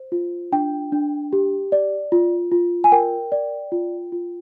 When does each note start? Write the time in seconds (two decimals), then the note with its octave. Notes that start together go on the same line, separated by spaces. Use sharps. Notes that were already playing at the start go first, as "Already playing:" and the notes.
Already playing: C5
0.12 F4
0.52 D4 G5
0.92 D4
1.33 G4
1.72 D5
2.12 F4
2.52 F4
2.84 G#5
2.92 A#4 G5
3.32 D5
3.72 F4
4.12 F4